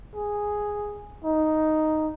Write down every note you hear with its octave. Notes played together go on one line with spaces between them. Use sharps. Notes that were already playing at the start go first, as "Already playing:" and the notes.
G#4
D#4